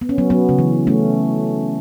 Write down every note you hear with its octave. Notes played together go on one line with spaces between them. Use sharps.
B3
C#4
F#3 B3
F#3 B3
C#3
E3
A3 C#4